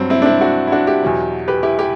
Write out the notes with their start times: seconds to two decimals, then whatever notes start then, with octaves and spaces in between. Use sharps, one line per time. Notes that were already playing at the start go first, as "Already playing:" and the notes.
Already playing: G2 F#3 C4
0.10 C4 E4
0.22 D4
0.26 C4 E4
0.41 D4 F#4
0.67 E4
0.72 D4 F#4
0.87 E4 G4
1.03 E2 B2 F#3
1.48 G4 B4
1.63 E4 G4
1.79 E4 G4